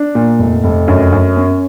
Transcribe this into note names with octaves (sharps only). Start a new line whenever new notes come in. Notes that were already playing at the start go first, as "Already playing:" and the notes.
Already playing: D4
A#2
F1
F1
F#2
F#2
C#4